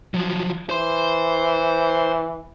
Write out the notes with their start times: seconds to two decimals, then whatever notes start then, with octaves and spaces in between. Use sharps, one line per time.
0.14 F3 F#3
0.70 E3 C5 C6